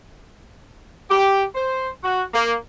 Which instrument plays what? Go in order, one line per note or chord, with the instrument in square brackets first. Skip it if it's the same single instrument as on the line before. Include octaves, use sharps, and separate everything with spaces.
[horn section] G4
C5
F#4
A#3